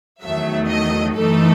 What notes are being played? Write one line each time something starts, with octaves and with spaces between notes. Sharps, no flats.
E2 D#3 F#3 A3 E5
D#5
F#2 E3 A3 D#4 A4